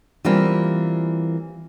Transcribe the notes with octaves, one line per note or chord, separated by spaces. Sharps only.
E3 G3 A#3 C4 E4 F4